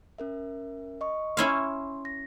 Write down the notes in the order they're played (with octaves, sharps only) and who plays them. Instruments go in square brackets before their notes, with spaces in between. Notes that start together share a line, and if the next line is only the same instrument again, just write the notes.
[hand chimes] C#4 A#4 E5
D#5 C#6
[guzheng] C#4 E4 F5 [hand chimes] C6
[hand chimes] A#6